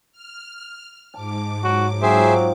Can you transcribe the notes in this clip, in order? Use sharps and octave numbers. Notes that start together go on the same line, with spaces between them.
F6
G#2 A5 D6
F#3 F#4
F#3 C4 D#4 F4 G#4 C5 E5